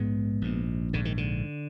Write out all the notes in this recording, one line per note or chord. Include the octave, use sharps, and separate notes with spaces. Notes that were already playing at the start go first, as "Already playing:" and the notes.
Already playing: A#1 G#2 G#3 B3
A#1 G#2
A#1 G#2 D3
D#3
D3